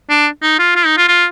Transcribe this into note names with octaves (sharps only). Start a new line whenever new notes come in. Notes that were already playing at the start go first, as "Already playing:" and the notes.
D4
D#4
F4
F4
D#4
F4
F4